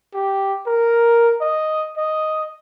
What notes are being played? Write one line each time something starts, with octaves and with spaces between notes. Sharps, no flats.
G4
A#4
D#5
D#5